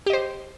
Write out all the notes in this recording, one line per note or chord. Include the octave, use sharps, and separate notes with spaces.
G4 C5 D#5